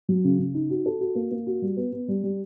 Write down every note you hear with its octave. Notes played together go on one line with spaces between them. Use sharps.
F#3
C#3
C#3
D#4
F#4
A4
F#4
A#3
A#3
F#4
G3
B3
B3
G3
G3